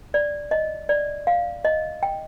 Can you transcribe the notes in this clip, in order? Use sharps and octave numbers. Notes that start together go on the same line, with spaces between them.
D5
D#5
D5
F5
D#5
G5